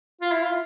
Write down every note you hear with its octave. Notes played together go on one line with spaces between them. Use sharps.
F4
E4
F4